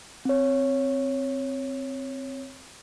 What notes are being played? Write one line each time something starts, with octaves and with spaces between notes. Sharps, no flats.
C4 C#5